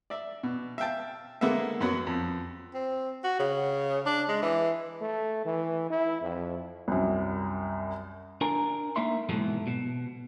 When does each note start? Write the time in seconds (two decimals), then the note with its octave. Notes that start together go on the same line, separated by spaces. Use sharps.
0.10 D5 E5
0.43 B2
0.78 E5 F5 G5 A5
1.41 D3 G#3 A#3 B3 A4 E5
1.81 F#2 F#3 B3
2.07 F2
2.74 C4
3.24 F#4
3.39 C#3
4.06 D4
4.29 G#3
4.42 E3
5.01 A3
5.45 E3
5.90 E4
6.22 F2
6.88 C2 F#2
8.41 D4 A#4 G#5 A#5
8.96 A3 A#3 D#4 A#4 E5 C6
9.29 G#2 B2 E3 F#3 A3 B3
9.67 B2